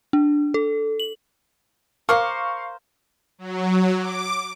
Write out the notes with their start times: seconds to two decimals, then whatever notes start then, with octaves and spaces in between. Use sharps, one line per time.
0.13 D4
0.54 A4
1.00 F#7
2.09 A#4 C5 F5 C#6 D6
3.38 F#3
3.98 D6